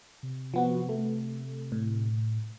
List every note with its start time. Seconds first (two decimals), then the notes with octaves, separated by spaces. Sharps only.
0.23 C3
0.54 F3 B3 F#4
0.89 A3
1.72 A2